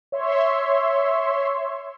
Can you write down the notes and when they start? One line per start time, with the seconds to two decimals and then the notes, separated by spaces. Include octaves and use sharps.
0.12 C#5 E5 C6